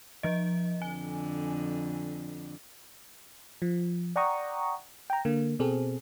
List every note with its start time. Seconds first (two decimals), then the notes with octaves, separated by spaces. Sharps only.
0.23 F3 D#5
0.82 F2 D3 G#5
3.62 F3
4.16 D5 F#5 G5 A#5 C#6 D#6
5.10 G5 A#5
5.25 D3 A#3
5.59 B2 C4 G#4 A4